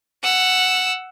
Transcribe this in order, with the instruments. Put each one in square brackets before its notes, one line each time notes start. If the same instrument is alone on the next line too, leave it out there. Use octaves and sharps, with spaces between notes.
[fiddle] F#5 E6